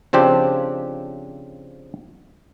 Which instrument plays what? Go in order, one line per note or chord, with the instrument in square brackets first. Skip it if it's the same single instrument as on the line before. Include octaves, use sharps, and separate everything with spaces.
[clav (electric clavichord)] C#3 F3 C4 D4 G4